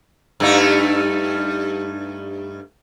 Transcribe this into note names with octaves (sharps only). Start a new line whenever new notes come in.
G2 A3 D#4